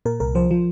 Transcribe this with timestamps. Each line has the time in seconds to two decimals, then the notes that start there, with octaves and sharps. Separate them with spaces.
0.06 A#2 A#4
0.20 C2 A#4
0.35 F3 C5
0.51 F3